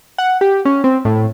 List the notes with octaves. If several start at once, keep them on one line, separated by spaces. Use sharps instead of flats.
F#5
G4
C#4
C4
A2